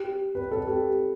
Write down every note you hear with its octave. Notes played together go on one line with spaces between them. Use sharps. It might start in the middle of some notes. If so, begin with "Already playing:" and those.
Already playing: G4
B4
A4
G4